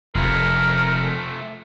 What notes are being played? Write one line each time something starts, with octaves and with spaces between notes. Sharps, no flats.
F1 F2 F3 A3 A#4